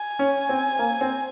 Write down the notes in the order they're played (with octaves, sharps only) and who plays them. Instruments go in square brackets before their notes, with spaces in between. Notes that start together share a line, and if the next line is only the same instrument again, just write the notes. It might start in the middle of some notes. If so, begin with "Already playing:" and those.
Already playing: [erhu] G#5
[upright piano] C#4
C4
A#3
C4